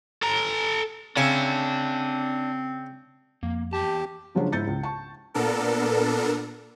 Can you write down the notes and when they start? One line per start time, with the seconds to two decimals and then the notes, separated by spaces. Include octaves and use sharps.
0.23 A4 A#5
1.17 C#3 C4 D4 E5 G#5
3.43 F2 A#3
3.73 E2 G4 A5
4.35 C#3 F3 F#3 G#3 C#4 D4
4.52 G#2 E4 G6 A6 C#7
4.67 C#2
4.83 A5 C#6
5.34 A#2 B3 D4 A4 A#4